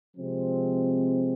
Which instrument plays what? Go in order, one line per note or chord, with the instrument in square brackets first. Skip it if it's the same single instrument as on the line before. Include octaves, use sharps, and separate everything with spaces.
[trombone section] C3 F3 G#3 C4